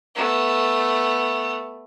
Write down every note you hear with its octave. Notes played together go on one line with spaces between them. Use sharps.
A3 B3